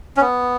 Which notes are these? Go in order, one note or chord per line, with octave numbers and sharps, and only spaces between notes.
C#4
B3